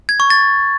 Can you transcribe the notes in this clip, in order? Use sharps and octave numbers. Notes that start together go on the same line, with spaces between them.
G#6
C#6
A6